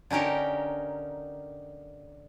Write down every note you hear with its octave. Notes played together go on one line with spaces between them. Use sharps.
D3 C#4 D#4 G4 A#4